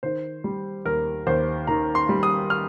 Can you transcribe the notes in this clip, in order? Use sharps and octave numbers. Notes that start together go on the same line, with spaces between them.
D#3 C5
G3
D#2 A#4
D#2 C5
D#3 A#5
C6
G3
D#6
F6